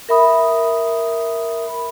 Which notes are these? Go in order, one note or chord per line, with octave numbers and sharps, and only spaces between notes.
A#4 E5 B5 D#6